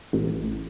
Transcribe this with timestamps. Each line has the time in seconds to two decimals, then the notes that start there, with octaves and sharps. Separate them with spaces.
0.13 A1